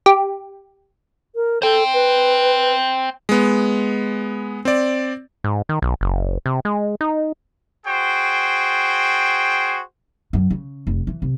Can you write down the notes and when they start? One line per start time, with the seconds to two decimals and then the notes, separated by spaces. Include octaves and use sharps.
0.06 G4
1.35 A#4
1.62 A4 C5 G5
1.94 B4
3.29 G#3 B3
4.65 C4 D5
5.44 G#2
5.69 D#3
5.82 B1
6.01 F#1
6.46 C3
6.65 G#3
7.01 D#4
7.87 F#4 G#4 C5 G5
10.33 F#2
10.50 C#3
10.87 F1
11.07 E3
11.22 C3